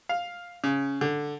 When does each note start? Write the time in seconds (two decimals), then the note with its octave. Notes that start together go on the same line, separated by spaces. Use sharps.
0.09 F5
0.64 C#3
1.01 D3